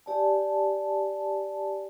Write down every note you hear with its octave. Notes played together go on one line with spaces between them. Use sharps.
G4 D5 G#5 A5